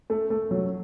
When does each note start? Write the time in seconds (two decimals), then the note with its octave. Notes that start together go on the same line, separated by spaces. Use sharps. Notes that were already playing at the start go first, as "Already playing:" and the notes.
0.10 A3
0.30 A3
0.51 F#3